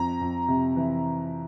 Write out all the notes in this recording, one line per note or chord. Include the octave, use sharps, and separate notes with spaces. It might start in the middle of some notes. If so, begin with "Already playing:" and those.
Already playing: F2 A#5
F2
C3
E3